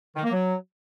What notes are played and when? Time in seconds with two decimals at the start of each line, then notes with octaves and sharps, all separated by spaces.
0.16 D#3
0.24 A#3
0.32 F#3